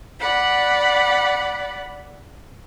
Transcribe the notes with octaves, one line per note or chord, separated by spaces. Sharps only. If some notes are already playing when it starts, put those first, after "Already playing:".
D5 F#5 B5